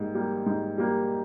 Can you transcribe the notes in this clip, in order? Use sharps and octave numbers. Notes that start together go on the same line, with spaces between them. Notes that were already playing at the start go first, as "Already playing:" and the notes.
Already playing: G#2 G3 A#3
G3 A#3
G#2
G3 A#3